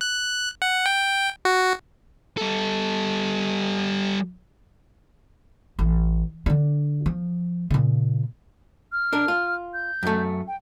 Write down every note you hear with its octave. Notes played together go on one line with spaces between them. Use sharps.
F#6
F#5
G5
F#4
G3 A4
A1
D3 D4
F3
A#2 C#3
F6
D4 A#4
F4
G6
F#2 A3
G5